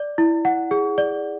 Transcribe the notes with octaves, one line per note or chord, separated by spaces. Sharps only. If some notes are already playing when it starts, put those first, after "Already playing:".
Already playing: D5
E4
F#5
G#4
D5